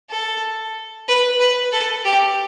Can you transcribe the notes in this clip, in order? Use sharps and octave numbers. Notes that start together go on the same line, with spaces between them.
A4
B4
B4
A4
G4